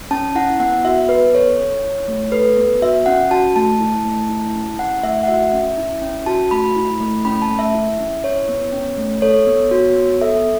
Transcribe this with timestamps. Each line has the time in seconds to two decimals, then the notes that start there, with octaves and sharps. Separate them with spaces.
0.11 C#4 A5
0.35 E4 F#5
0.60 B3 F#5
0.85 F#4 E5
1.09 B3 B4
1.34 A4 C#5
1.59 C#4
1.84 E4
2.08 A3
2.32 A4 B4
2.57 B3
2.82 F#4 E5
3.06 C#4 F#5
3.31 F#4 A5
3.56 A3 A5
3.80 E4
4.05 A3
4.29 E4
4.54 C#4
4.79 E4 F#5
5.03 A3 E5
5.23 F#5
5.28 F#4 E5
5.53 C#4
5.77 E4
6.02 C#4
6.26 F#4 A5
6.51 A3 B5
6.76 E4
7.01 A3
7.25 C#4 B5
7.42 A5
7.50 A3
7.59 E5
7.74 E4
7.99 C#4
8.24 E4 C#5
8.49 B3
8.72 C#4
8.97 A3
9.22 A4 C#5
9.47 B3
9.71 F#4
9.96 B3
10.21 A4 E5